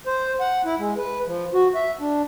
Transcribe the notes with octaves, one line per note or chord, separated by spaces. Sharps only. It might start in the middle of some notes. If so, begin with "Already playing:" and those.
C5
F#5
E4
G#3
B4
F3
F#4
E5
D4